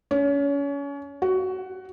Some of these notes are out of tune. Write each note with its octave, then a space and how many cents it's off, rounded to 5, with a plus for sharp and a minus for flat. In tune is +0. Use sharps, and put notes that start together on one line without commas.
C#4 +30
F#4 +15